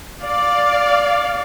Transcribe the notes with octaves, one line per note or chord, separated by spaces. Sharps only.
D5 F5